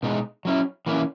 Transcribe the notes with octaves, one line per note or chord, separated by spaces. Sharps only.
B2 G#3 D#4
F#3 C#4 E4
E3 A#3 C#4 E4